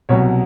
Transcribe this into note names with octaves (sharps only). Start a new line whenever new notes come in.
C2 B2 F#3 C#5